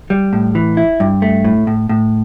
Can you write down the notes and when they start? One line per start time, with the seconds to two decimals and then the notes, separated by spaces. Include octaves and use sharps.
0.10 G3
0.33 A2
0.55 E3
0.77 E4
1.00 G2
1.22 A3
1.44 A2
1.67 A2
1.89 A2